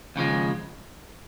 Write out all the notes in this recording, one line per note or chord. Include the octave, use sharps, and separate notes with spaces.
D#2 C#3 F3 G#3